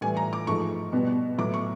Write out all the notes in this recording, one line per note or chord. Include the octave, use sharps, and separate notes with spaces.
A2 E3 G3 G#5
A#5
D6
G#2 F3 A3 C#6
B2 G3 B3
A2 F#3 B3 D6
C#6